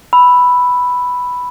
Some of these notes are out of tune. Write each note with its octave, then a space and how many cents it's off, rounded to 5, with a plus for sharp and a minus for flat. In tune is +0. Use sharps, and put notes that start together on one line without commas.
B5 +0 E6 +0